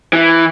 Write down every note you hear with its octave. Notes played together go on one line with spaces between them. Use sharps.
E3